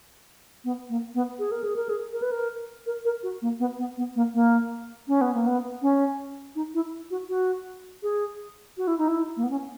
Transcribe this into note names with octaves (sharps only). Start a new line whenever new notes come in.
B3
A#3
B3
G#4
A#4
G#4
A#4
G#4
A#4
B4
A#4
A#4
A#4
F#4
A#3
B3
B3
B3
A#3
A#3
C#4
B3
A#3
B3
C#4
D#4
E4
F#4
F#4
G#4
F#4
E4
D#4
E4
A#3
B3
C#4